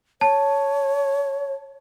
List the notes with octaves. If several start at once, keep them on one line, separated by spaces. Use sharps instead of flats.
C#5 A5